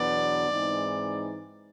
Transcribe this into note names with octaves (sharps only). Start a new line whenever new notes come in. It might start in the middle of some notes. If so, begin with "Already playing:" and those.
Already playing: E2 B2 F#3 B3 D4 D5
G#2 E3 G#3 C4 D#4